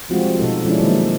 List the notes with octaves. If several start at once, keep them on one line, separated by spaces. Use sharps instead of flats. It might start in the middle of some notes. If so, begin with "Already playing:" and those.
F3 G3 G#3 C4 F4 F#4
B2 D#4 A4
F3 G#3 C#4 D4 E4
D#3 F#3 G#3 A#3 D#4 E4